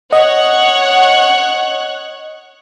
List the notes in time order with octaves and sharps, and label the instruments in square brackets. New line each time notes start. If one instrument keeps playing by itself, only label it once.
[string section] C#5 F#5 F#6 [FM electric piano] D#5